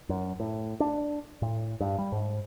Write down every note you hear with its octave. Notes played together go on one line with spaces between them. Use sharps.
F#2
A2
D4
A2
G2
G3
G#2